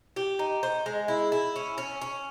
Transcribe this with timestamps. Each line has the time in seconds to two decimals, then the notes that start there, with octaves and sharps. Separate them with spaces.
0.16 G4
0.39 D#4
0.63 C5
0.86 G#3
1.08 E4
1.32 E4
1.56 C#4
1.78 C#4
2.01 C#4